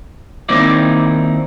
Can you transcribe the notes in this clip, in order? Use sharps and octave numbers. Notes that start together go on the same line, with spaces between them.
D#3 A#3 C4 D#4 E4 D5